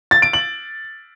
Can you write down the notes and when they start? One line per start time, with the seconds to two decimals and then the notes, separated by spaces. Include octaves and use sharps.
0.11 A6
0.22 D7
0.33 F#7